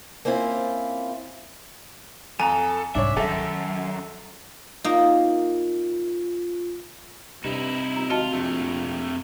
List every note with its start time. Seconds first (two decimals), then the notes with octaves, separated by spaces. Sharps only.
0.25 A#3 C4 C#4 E4 F4
2.40 F2 A4 G#5 A#5
2.95 C2 G#2 D4 C#5 E5
3.17 F#2 D#3 D#4 A4 E5
4.84 A#3 D#4 F4
7.45 G2 C3 D#4 E4
7.96 D#1 A#5
8.10 G#1 F4 F#4 D#5 A5
8.33 A#1 F2 A3